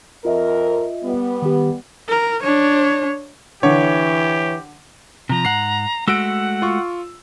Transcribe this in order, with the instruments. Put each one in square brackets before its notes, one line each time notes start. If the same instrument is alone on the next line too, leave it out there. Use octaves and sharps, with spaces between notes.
[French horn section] F2 A#4 [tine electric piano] F4 D#5 E5
[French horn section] G3 B3
[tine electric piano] D#3 G4
[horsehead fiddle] A#4
D4 C#5
[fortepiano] D3 [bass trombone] E3 [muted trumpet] G4 [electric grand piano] C#5
[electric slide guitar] C3 F3 [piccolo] A#5
[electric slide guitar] G#2 F#5 [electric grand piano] C7
[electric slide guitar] G#3 A3 F#4 [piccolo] F#5 [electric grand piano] E6 D7
[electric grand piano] F4 C#6